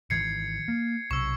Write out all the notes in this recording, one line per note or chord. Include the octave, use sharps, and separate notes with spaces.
G#1 D#3 E3 G#6 C7 C#7
A#3
B1 C3 C#6 E6